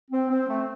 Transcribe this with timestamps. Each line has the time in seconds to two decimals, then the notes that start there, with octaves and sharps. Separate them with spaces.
0.11 C4
0.29 C4
0.48 A3